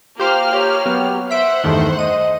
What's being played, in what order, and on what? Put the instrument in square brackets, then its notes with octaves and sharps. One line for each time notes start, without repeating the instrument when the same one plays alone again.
[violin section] A#3 F6 [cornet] F4 [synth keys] G4 C5 F5
[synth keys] G4 [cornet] C#5
[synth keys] F#3 B3 G4
[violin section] C5 F#5 [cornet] E5 [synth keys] B6 D7
[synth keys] E2 G2 D#3 [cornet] A3
[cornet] D#5 [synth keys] D#7